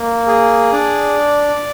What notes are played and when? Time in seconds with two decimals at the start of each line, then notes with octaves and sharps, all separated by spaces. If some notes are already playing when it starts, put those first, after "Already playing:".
Already playing: A#3
0.27 G#4
0.72 D4 D5